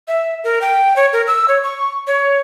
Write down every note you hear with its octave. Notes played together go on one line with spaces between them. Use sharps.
E5
A#4
G5
C#5
A#4
E6
C#5
C#6
C#5